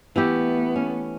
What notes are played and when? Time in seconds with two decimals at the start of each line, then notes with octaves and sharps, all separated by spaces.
0.16 E3 A3 B3 G4
0.76 C#4